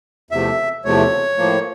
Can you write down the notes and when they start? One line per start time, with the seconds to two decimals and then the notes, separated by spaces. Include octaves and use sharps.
0.31 E2 C3 F3 A3 E5
0.85 E2 C3 F3 A3 C#5
1.38 A2 F3 A#3